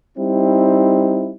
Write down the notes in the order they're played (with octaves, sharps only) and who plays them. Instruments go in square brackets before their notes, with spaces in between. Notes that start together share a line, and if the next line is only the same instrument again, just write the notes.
[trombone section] G3 C4 D#4 E4